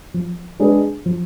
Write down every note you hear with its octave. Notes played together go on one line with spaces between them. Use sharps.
F3
G#3 D4 G#4 B4
F3